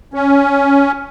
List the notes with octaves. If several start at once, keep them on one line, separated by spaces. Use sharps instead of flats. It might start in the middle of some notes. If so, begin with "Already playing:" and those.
C#4